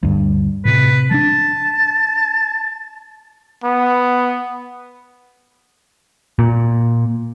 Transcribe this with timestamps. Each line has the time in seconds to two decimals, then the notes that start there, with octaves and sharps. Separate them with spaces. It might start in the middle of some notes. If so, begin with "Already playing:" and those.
0.03 D2 G2
0.65 A2 C3 B4
1.11 F3 D4 A5
3.64 B3
6.39 A#2